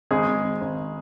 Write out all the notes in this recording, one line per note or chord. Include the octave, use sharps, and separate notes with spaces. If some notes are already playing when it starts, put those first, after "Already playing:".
G#1 G#3 G#4
G#1
G#1
G#1